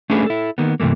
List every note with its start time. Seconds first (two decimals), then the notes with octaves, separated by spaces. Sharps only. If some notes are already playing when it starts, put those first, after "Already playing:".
0.10 A3 C#4 D4 G#4 A4 B4
0.26 E4 A4
0.58 D#3 A#3 B3
0.80 G2 C3 E3 A3 A#3